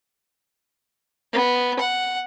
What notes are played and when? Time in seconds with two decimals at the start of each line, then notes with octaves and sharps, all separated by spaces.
1.33 B3
1.79 F#5